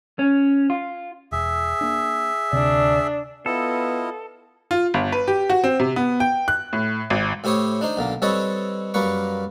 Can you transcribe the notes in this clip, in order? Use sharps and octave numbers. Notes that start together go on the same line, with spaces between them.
C#4
F4
E1 G#4 E5
A#3 D4
D2 C3 D4
B3 E4 F4 A4 D#5
F4
G1
B4
G4
F#4
C4
C3
B3
G5
F#6
A2
G#1
A2 E4 G4 C5 C#5 D#6
D4 D#4 C5
B1 D3 A#3
G3 C4 A4 B4 C#5 D#5
F#2 G3 A#3 B4 C#6